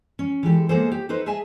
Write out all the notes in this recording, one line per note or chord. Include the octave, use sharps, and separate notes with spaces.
C#4
E3 G#3 G4 A4
G#3 A#3 B3 G#4 A4 C5
G4
D#4 A4 B4 C5
G#4 D#5 E5 G#5 A5